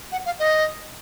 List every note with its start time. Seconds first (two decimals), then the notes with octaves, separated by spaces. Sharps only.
0.12 F#5
0.26 F5
0.39 D#5